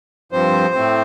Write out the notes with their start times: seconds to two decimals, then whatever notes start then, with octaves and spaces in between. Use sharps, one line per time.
0.32 G2 F3 C4 C5
0.75 A2 A3 C4